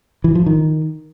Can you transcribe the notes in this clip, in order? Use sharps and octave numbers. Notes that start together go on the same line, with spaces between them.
E3
F3
D#3